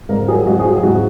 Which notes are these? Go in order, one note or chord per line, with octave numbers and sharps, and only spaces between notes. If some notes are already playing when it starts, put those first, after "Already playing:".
G#2 A#4
F#3 G#4
G#2 F#4
G#4
F#3
G#4
G#2 F#4